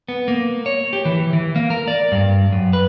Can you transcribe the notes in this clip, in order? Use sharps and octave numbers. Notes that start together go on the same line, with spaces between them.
B3
A#3
C#5
G4
E3
E3
A#3
A#4
D5
G2
F#2
B4